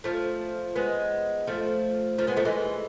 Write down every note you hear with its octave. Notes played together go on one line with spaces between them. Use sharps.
F3 A3
G#3 B3
F3 A3
F3 A3
G#3 B3
F3 A3
E3 G#3